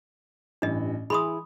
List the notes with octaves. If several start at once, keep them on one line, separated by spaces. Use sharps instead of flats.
A1 G2 E3 D4 D#5
E3 E4 G#4 B5 C6 D#6